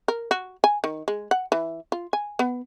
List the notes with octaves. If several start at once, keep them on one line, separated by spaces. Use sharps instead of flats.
A#4
F#4
G#5
D#3
G#3
F#5
E3
F4
G#5
B3